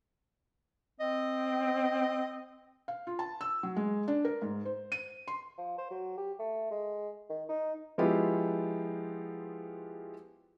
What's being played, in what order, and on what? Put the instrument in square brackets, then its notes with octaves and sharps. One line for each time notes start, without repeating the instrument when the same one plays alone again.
[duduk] C4 [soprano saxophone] D#5
[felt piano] F5
F4
A5
E6
F#3
G#3
D4
A#4
G#2
C5
D#7
C6
[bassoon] F3
C5
F#3
G4
A3
G#3
D#3
D#4
[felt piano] F3 G#3 B3 E4 F4 G4